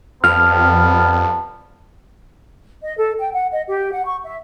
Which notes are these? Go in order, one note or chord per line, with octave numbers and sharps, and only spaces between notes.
F2 G3 B3 A5 F6
D#5
A4
G5
F#5
D#5
G4
F#5
C#6
E5